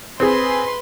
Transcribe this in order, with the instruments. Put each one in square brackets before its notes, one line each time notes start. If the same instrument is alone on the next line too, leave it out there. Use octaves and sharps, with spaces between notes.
[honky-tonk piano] C4 G#4 [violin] B4 C6